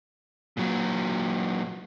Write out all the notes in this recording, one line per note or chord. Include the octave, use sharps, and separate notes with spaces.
A#2 F#3